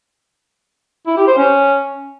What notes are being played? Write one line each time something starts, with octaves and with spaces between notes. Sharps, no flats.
E4
G4
C5
C#4